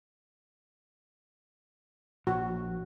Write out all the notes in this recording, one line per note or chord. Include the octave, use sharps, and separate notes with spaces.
A#1 F#4